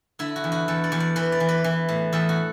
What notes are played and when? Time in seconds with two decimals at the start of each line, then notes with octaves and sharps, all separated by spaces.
0.19 D3 E4
0.36 F#4
0.44 E2
0.52 F#4
0.68 E2 A4
0.84 D5
0.92 E2
1.00 D5
1.16 E3 B4
1.32 D5
1.40 E3
1.49 B4
1.64 E3
1.89 A2
2.13 E2 A4
2.29 F#4